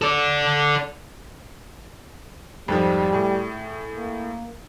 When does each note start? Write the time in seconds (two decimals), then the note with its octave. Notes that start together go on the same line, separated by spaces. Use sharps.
0.02 A4 D5
2.68 F2 G#2 F3 G3
3.13 A2 G#4
3.94 A#3